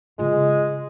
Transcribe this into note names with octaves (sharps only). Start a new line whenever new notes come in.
C#3 G#3 F4